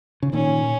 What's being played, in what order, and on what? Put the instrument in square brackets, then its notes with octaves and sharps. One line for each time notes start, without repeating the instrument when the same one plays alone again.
[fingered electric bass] C#3
[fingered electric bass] A#2 D#3 [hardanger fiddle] C#4